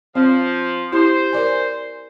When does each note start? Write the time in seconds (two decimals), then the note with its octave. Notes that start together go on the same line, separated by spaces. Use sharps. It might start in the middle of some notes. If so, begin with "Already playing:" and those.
0.15 F3 C4
0.92 E4 G4 C5
1.33 A#4 D5 G#5